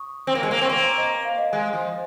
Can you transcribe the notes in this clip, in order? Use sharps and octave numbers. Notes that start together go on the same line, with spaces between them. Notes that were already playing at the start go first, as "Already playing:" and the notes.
Already playing: C#6 D#6
C4
A#3
G#3
A#3
C4
C#6
A#3 C6
A#5
D#5
F5
D#5
G#3
F3